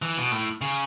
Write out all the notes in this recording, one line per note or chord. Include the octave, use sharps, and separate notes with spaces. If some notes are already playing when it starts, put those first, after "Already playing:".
E3
B2
A2
C#3